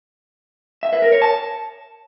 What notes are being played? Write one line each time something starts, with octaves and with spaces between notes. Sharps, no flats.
E5
B4
A#4
C#5
A5